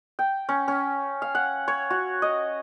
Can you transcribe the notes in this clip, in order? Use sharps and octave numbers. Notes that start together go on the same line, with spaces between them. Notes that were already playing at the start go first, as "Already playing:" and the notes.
G5
C#4
C#4
F5
F#5
C#5
F#4
D#5